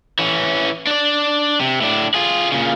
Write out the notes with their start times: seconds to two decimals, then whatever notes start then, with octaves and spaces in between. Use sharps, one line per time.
0.19 E3 C#4
0.87 D4 D5
1.61 C3
1.81 A2 D4
2.14 F4 G#4
2.52 A#2 C#3